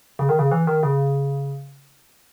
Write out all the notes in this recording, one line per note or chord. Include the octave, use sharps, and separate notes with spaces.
C#3
D#3
C#3
E3
D#3
C#3